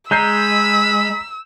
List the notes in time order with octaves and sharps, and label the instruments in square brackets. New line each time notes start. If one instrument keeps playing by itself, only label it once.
[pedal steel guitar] G#3 [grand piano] A#5 G6 C7 [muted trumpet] B5 [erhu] E6